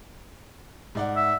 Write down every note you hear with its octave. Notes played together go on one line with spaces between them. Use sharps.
G#2 D5 F#5
E5